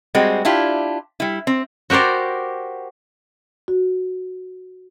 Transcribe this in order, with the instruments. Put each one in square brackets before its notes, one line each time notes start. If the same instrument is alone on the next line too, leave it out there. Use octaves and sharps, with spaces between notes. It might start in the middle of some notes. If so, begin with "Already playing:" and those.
[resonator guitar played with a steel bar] G3 G#3 C4 F#4
D4 E4 F4 G4
G3 E4
C4
[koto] F#4 G4 A#4 C5 D5
[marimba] F#4